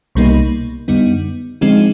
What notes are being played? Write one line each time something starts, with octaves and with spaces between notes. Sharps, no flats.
C2 B2 G3 A#3 D#4
F#2 D3 G3 B3 D#4
D3 F3 G#3 C4 D#4